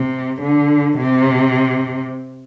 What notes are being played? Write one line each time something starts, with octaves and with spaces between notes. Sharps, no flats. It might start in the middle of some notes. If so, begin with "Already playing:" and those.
Already playing: C3
D3
C3